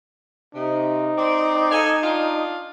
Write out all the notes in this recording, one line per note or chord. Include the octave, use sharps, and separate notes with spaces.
C3 D#4
C4 D5
A4 F5 G#5
D4 F4